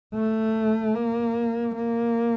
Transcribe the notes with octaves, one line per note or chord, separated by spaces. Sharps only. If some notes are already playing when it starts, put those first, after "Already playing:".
A3
A#3
A#3